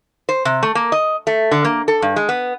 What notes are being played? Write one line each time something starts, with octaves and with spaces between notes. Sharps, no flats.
C5
C3
A3
A#3
D#5
A3
D3
A#3
A4
G2
G#3
B3